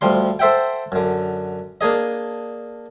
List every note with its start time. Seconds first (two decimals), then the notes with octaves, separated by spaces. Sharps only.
0.01 D2 F3 G3 C6
0.39 A4 C5 E5 F#5 G5
0.92 F#2 D3
1.81 A#3 D4 G#4 D#5